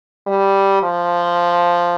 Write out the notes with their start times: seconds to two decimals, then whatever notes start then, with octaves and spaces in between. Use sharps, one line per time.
0.27 G3
0.83 F3